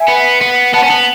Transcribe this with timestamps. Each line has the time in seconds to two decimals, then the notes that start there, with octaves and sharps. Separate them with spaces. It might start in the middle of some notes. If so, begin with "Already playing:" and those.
Already playing: E5 G#5
0.08 B3
0.41 B3
0.74 B3 F#5 A5
0.83 C#4
0.90 B3